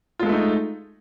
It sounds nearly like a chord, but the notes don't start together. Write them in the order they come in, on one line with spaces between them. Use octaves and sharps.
F4 G#3 A4 A3 D#4